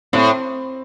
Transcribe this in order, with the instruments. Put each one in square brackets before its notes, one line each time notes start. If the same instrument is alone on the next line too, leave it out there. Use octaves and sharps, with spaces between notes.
[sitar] A2 [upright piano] C4